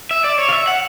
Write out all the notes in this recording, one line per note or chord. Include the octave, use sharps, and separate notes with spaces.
E5
D5
C#5
F5
E5
F#5